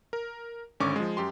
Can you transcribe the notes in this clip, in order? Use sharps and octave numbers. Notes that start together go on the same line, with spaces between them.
A#4
G#1 D3 C#4 C#6 D6
F3 G#3
F#2 G4 C6